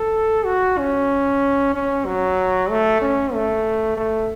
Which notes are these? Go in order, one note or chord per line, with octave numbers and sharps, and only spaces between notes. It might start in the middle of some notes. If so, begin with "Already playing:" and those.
Already playing: A4
F#4
C#4
C#4
F#3
A3
C#4
A3
A3